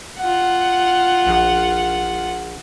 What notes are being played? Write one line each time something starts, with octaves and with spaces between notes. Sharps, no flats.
F4 F#5
A#1